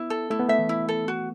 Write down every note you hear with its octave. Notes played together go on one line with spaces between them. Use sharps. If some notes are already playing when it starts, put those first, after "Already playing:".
Already playing: B3 E4
A4
A3 E4
B3
A3 E5
E3
E4
A4
F#4